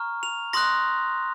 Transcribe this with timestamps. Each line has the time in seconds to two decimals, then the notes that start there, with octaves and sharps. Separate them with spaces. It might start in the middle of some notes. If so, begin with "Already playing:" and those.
Already playing: A#5 C#6 F6
0.23 F7
0.53 C6 D#6 F#6 A#6